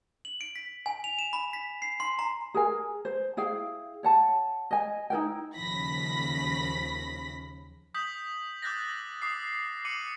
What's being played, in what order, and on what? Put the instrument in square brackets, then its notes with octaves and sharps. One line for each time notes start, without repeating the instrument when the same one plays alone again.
[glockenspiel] F#7
D7
B6
G#5
F7
E7
B5
B6
C7
C6
A#5
[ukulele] G#4 A#4 G#5
C5
E4 G#4 F5 G5
C#5 F#5 A5
D#5 G#5
D#4 E4 A#4 G5
[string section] D#2 C#3 F3 B5 A#6 B6
[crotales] D#6 G6 B6 F#7
D6 E6 F#6 G6 A6 A#6
D6 D#6 C7
D6 C#7 D#7 F#7